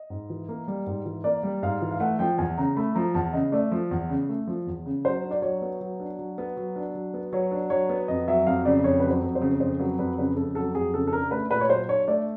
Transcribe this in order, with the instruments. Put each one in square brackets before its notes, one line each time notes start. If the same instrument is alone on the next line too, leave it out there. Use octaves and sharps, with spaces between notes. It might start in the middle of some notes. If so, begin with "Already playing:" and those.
Already playing: [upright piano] D#5
[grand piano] G#2
E3
A#3
G3
G#2
E3
[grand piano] A#3 [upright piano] D5
[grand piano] G3
[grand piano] G#2 [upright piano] F5
[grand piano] E3
[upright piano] F5
[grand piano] A3 [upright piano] F#5
[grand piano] F3 [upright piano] G5
[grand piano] E2 [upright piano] G#5
[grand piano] C#3 [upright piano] A#5
[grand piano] A3 [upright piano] B5
[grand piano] F3 [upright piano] A#5
[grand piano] E2 [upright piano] A5
[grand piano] C#3 [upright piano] D#5
[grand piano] A3 [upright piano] D5
[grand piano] F3
E2
C#3
A3
F3
E2
C#3
[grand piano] F#3 [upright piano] C5
[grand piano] D4
[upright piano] D5
[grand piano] F#3 [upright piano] C#5
[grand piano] B3
F#3
D4
F#3
B3
F#3
D4
F#3
B3
[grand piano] F#3 [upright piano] C#5
[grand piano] D4
[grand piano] F#3 [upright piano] C#5
[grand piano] B3
[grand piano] F2 [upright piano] D#5
[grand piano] F#3 [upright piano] E5
[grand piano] F2 [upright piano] F5
[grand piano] C#3 [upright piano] D5
[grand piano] F2 [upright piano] C#5
[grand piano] F#3 [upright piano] B4
[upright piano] C5
[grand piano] F2
[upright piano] C5
[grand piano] C#3
[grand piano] F2 [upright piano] C5
[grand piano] F#3 [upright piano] B4
[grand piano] F2 [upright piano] B4
[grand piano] C#3 [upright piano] B4
[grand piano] F2 [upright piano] A4
[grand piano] F#3 [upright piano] A4
[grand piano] F2 [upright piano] G#4
[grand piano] C#3 [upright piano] A4
[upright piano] A4
[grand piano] D4 [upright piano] A#4
[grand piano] A3 [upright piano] B4
[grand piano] A#2 [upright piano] B4
[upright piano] C#5
[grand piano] F#3 [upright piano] C5
[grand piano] D4 [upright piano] C#5
[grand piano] A3 [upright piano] D5